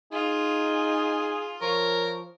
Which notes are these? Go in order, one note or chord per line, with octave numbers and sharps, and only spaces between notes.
D#4 F4 G#4
F3 A#4 C#5